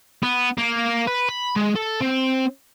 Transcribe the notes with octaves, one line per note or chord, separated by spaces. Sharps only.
B3
A#3
B4
B5
G#3
A4
C4